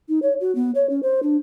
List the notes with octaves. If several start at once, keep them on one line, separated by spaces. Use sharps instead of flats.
D#4
C#5
F#4
B3
C#5
C#4
C5
D4